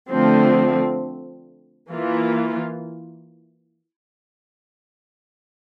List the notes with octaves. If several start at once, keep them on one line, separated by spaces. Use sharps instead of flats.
D3 F3 A3 C4
E3 A#3 F4